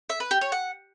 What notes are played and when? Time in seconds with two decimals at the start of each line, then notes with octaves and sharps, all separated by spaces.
0.09 E5
0.20 B4
0.31 G4
0.41 C#5
0.52 F#5